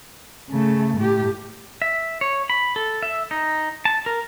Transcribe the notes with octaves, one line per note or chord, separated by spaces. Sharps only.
C#3 A3
A2 G4
E5
C#5
B5
A4
E5
D#4
A5
A#4